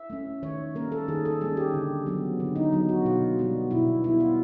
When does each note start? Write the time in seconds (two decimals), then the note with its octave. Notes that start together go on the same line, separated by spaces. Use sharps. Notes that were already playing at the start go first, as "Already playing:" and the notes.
Already playing: E5
0.10 A3 C#4
0.43 D#3 C#5
0.75 G3 A#3 C#4 A#4
0.92 A4
1.08 D#3 G#4
1.25 A4
1.41 G3 A#3 C#4 G#4
1.57 G4
1.74 D3
2.06 F#3 B3
2.40 D3
2.56 D#4
2.73 F#3 B3
2.89 F#4
3.05 B2 F4
3.39 G3 B3
3.71 B2 E4
4.04 G3 B3 E4
4.20 F4